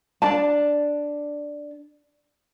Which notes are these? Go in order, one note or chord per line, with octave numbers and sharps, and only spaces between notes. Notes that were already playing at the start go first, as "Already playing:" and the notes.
D4 D5 A5